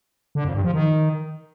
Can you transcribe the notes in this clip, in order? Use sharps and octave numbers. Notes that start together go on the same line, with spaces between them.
D3
F2
G2
F3
D#3